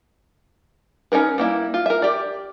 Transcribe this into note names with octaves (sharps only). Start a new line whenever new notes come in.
C#4 D#4 A#4 B4
G3 A#3 E4
F4
A#4 E5
G4 D5